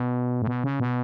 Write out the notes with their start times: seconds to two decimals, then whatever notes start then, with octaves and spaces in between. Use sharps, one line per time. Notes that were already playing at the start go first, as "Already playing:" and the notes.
Already playing: B2
0.42 A2
0.47 B2
0.64 C#3
0.80 B2